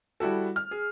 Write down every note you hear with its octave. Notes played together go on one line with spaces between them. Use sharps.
G3 E4 F#4 A4
F6
G#4